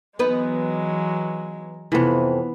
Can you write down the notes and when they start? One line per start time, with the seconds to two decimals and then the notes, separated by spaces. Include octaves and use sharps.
0.19 E3 F#3 G#3 B3 D#4 B4
1.92 F2 C3 E3 B3